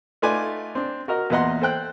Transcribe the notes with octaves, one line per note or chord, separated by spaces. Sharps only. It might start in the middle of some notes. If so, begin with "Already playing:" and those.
A3 D#4 F4 B4 D5 G#5
C4 D4
F#4 A#4 D#5
E2 A#2 B4 D#5 F#5 C6
A4 C5 G5 F#6